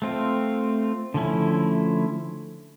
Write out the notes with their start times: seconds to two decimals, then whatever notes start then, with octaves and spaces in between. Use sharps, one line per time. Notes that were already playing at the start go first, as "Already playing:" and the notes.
0.02 A3 C4 F4
1.14 D3 F3 A3 C#4 E4